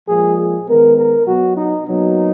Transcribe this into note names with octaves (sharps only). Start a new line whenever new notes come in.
A#2 F3 G#3 G#4
G#4
D#3 G#3 B3 A#4
A#4
B2 F#3 B3 F#4
D#4
B2 F#3 A#3 D#4